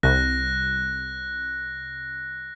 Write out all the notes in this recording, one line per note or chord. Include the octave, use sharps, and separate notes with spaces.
C2 F#6 A#6